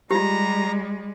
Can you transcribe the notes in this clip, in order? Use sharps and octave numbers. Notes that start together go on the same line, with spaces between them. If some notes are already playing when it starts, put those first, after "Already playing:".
G3 G#3 F4 G4 A#5